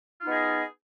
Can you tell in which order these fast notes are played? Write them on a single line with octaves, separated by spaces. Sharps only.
F4 D#4 B3 D#5 G#4